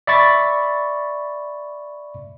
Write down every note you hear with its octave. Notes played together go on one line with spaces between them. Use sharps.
D5 E5 B5 C#6 A6